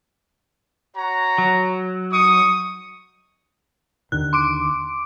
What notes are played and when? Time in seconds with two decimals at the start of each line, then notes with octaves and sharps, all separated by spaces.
0.97 F#4 C#5 A#5
1.38 F#3
2.11 D#4 C#6 D#6
4.12 D#2 D3 D#3 F#6
4.33 C6 D6 D7